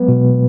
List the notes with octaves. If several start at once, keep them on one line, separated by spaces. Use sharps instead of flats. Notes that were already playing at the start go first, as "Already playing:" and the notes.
Already playing: F#3 G#3 B3 B4
B2